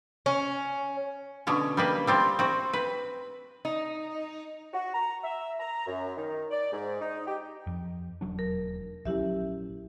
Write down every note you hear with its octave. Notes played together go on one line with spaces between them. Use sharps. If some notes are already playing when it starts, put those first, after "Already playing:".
C#4
B2 D3 C#4 C#5
G3 A#3 B4
G3 C4 F4
C4 F#4
B4
D#4
F#4
A#5
E5
A#5
F#2
D#3
D5
G#2
D#4
G4
F2
E1 F#3 D4
A#4
A#1 F#3 C#4 E4 G4 E5